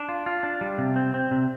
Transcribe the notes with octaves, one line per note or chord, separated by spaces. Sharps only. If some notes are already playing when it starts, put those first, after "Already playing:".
Already playing: D4
F4
F4
D4
G3
C3
C4
C4
C3